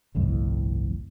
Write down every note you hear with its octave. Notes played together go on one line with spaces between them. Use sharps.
G1 C2 F2 A2